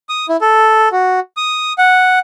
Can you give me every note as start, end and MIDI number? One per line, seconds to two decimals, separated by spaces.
0.09 0.26 87
0.29 0.37 64
0.41 0.88 69
0.92 1.20 66
1.37 1.73 87
1.78 2.19 78